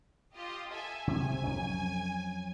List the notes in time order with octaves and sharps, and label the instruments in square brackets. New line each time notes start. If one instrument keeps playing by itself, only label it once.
[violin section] F4 G4 D#5
A4 E5 G#5
[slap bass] C3 [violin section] G#5
[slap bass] F2 F#3 C#4